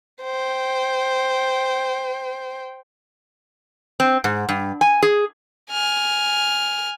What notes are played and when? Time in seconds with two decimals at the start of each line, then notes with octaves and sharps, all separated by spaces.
0.22 C5 G5
4.00 C4
4.24 G#2
4.49 G2
4.81 G#5
5.03 G#4
5.71 G#5 F6